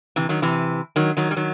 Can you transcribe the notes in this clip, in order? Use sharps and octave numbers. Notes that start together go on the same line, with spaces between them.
C3 E3
D#3 F#3
C3 E3
D#3 F#3
D#3 F#3
G3
D#3 F#3